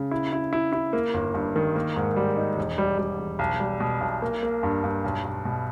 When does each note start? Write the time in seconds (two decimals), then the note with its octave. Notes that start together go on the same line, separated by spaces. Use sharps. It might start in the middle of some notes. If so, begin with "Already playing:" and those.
Already playing: C#3
0.11 E4
0.33 E4
0.53 E4
0.73 E4
0.93 A#3
1.14 G1
1.34 G2
1.56 D#3
1.76 A#3
1.96 G#2
2.16 G3
2.37 D#4
2.57 E1
2.78 G3
2.98 G3
3.19 E1
3.39 B1
3.60 G3
3.80 B2
4.01 B1
4.22 A#3
4.42 A#3
4.63 G2
4.84 G2
5.04 B1
5.25 B1
5.45 B2